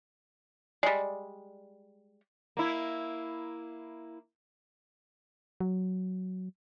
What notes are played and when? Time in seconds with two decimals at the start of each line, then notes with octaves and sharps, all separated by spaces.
0.83 G3 G#3 D5
2.57 A#3 E4
5.60 F#3